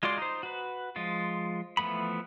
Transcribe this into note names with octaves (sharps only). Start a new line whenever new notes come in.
G#3 F4 F#4 D5 C6
D#4 C5
F#4 B4
F3 G#3 F4
E3 F3 A3 B3 B5